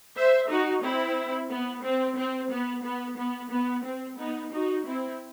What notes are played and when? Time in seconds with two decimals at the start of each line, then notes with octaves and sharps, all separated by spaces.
0.15 C5 E5
0.49 D#4 F#4
0.82 C4 E4
1.50 B3
1.83 C4
2.17 C4
2.51 B3
2.84 B3
3.17 B3
3.51 B3
3.85 C4
4.18 B3 D#4
4.52 D#4 F#4
4.86 C4 E4